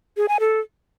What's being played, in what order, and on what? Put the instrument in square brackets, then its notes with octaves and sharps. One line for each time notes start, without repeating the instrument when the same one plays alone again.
[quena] G#4
G#5
A4